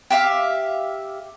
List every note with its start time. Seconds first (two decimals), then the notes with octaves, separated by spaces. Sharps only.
0.10 G4 E5 F5